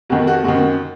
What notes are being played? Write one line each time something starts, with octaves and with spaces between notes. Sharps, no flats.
F2 D#3 F#4
F#4
F#2 D#3 F#4